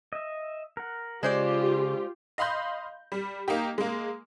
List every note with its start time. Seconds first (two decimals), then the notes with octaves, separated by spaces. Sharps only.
0.13 D#5 E5
0.77 A#4 F#5
1.23 C#3 G#3 F4 G4 C5 D5
2.38 D#5 F5 B5 C6 G6
3.12 G3
3.48 A#3 D#4 G4
3.78 G#3 A#3